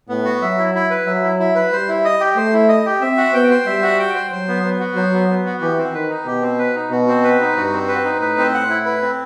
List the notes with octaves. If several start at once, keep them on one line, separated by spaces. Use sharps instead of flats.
A2 B3
F#4
F#3 E5
E4
E4
B4
F#3 E5
E4
E4
B4
G3 C5
E4
D#5
G4
A3 C5
E4
D#5
G4
C4 E5
F#4
B3 G5
C5
G3 E5
F#4
G5
C5
F#3 C5
B3
B3
F#4
F#3 C5
B3
B3
F#4
E3 G4
C4
D#3 B4
D#4
B2 G4
C4
B4
D#4
B2 F#4
C4
B4
D#4
G2 F#4
C4
B4
D#4
A2 B4
C4
F#5
E4
B4
C4